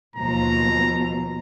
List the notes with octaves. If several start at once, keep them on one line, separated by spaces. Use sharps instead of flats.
D#2 B2 F3 A#5